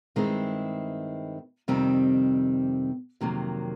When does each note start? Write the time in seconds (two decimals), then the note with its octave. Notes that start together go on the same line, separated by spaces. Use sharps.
0.16 G2 D#3 G#3 C4 E4
1.68 F2 C3 D#3 G3 C4
3.21 F2 C3 D#3 F#3 A#3